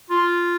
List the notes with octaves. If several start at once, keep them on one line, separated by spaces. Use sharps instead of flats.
F4